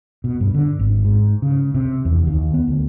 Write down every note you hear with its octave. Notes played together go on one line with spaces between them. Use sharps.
B2
G2
D3
G#1
G#2
C#3
C3
E2
D#2
B3
D2